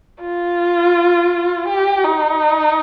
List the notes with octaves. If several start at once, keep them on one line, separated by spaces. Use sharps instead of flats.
F4
G4
D#4